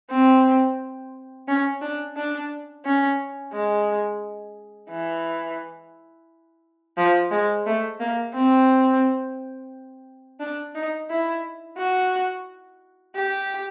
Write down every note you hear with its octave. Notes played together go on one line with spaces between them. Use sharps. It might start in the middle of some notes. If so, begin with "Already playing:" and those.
C4
C#4
D4
D4
C#4
G#3
E3
F3
G#3
A3
A#3
C4
D4
D#4
E4
F#4
G4